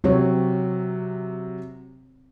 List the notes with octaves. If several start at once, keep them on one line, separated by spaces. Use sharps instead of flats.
C3 F#3 C4 C#5